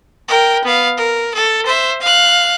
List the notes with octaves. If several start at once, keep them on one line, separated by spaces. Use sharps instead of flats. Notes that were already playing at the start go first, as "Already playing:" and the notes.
A#4 G5
B3 F5
A#4
A4
C5 E5
F5 F#6